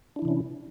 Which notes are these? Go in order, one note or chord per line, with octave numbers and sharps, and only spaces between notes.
C3 E3 C#4 D4 E4